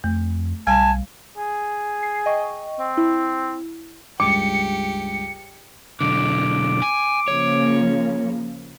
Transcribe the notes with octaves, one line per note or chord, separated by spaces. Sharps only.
F2 A3
B1 G3 G#5 A5
G#4
C7
D#5 G5 C#6
C4
E4
C#2 G2 G4 D6 C#7
B1 D3 D6
G#5
C#3 F3 A#3 C#5